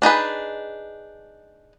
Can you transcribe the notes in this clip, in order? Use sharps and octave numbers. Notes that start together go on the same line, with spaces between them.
D4 D#4 G#4 B4